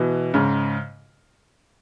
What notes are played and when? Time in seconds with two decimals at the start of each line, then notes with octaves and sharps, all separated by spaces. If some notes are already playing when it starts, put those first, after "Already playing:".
Already playing: B2 E3
0.34 G#2 C#3